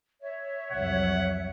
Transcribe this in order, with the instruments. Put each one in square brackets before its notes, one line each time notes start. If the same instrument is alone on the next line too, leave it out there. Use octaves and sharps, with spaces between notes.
[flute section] C#5 E5
[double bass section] C2 F2 F#3 [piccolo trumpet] F#5